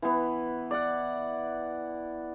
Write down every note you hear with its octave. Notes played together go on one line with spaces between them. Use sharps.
E3 B3
D5 F#5